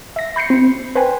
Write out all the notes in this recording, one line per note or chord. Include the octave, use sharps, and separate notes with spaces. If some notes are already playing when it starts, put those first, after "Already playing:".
E5 A#6
B5 G6 C7 C#7
C4
B4 C5 G5 G#5